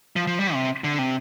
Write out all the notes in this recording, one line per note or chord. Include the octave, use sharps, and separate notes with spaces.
F3
F3
G3
C3
D3
C3